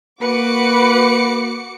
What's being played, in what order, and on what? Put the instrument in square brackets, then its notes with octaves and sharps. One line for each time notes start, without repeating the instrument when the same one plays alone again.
[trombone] A#3 [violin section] F#4 D6 C#7 [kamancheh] B4 B5